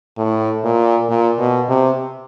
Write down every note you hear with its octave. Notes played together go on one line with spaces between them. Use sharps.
A2
A#2
A#2
B2
C3